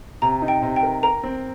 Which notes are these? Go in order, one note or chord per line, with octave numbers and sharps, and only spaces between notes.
C3 A#5
D#4
G5
C3
G5
A#4
A#4 A#5
C4